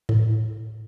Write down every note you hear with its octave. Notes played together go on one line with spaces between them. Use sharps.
A2